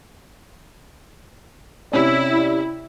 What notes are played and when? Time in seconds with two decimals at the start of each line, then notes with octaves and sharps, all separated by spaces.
1.92 C3 C#4 E4 D5